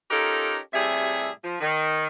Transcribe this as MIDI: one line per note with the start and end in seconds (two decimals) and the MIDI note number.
0.10 0.58 61
0.10 0.58 63
0.10 0.58 65
0.10 0.58 67
0.10 0.58 69
0.10 0.58 70
0.73 1.29 45
0.73 1.29 48
0.73 1.29 55
0.73 1.29 68
0.73 1.29 76
1.43 1.56 53
1.60 2.07 51